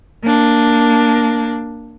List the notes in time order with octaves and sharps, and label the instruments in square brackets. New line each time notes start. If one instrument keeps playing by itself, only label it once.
[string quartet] A#3 D4